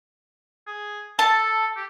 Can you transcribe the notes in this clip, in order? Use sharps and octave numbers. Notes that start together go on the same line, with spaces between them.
G#4
A4 A5
G4